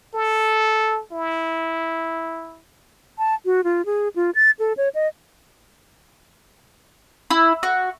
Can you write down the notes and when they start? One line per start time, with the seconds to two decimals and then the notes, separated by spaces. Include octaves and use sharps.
0.14 A4
1.12 E4
3.18 A5
3.45 F#4
3.64 F4
3.86 G#4
4.16 F4
4.35 A6
4.59 A4
4.77 C#5
4.95 D#5
7.30 E4
7.63 F#4